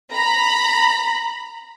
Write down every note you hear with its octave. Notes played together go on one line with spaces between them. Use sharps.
A#5 B5